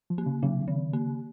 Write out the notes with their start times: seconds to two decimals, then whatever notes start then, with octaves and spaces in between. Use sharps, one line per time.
0.10 F3
0.18 A#3
0.26 C#3
0.43 C#3 F#3
0.52 C3
0.60 C#3
0.68 D#3
0.93 A#3